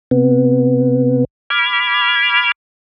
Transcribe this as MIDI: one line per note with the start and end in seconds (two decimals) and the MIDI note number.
0.11 1.24 48
0.11 1.24 59
1.50 2.52 83
1.50 2.52 86
1.50 2.52 89
1.50 2.52 92